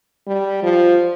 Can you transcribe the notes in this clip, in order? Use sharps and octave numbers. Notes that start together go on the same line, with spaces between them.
G3
F3